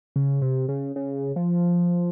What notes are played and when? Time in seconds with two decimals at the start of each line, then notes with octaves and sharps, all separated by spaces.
0.16 C#3
0.42 C3
0.69 C#3
0.96 C#3
1.36 F3